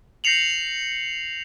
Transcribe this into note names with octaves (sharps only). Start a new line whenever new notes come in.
G6 A#6 C7 C#7 F7 F#7